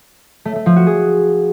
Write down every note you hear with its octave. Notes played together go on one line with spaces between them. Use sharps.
A3
A3
F3
F#4
G#4